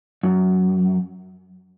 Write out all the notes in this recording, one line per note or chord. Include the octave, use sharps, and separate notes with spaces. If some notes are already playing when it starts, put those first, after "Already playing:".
F#2